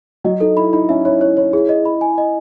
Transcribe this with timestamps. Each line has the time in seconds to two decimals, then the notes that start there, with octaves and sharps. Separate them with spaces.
0.24 F#3 D#5
0.40 D#4 A4
0.57 E4 B5
0.73 D#4 B5
0.89 C#4 E5
1.05 E4 C#5
1.21 E4 C#5
1.37 E4 C#5
1.53 E4 G#4
1.69 D#5
1.85 B5
2.01 G#5
2.18 D#5